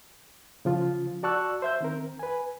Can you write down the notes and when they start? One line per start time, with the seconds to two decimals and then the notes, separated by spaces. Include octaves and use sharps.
0.65 C#3 F3 F4
1.23 F#4 D5 A5 C#6 E6 F#6
1.62 C5 E5 G6
1.81 D#3 C4 A#4
2.19 B4 G#5